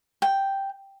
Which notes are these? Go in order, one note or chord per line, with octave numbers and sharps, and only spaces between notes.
G5